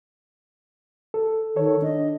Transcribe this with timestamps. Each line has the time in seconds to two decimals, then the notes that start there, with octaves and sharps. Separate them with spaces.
1.14 A4
1.56 D#3 A4 C#5
1.82 D4 D#5